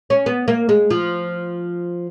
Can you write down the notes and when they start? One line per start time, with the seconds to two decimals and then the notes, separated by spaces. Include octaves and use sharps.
0.10 C#4
0.26 B3
0.48 A#3
0.69 G#3
0.91 F3